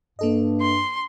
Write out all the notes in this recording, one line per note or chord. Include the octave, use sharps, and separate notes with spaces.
G2 A#3 A4 D#5
C6